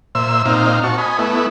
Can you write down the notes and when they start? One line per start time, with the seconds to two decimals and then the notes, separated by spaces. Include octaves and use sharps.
0.15 A#2 C5 E5 E6
0.46 A#2 C4 D#4 F5
0.84 F#4 A5 C#6
0.98 D#5 G#5 B5
1.19 A3 B3 E4